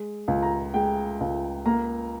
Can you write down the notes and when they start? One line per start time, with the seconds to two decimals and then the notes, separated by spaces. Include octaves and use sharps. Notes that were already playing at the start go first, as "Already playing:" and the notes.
Already playing: G#3
0.28 C#2
0.42 A#5
0.74 G#3 G5
1.20 C#2
1.66 A#3 A#5